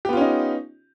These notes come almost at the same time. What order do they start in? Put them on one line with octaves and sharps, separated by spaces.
G4 B3 F4 C#4 D#4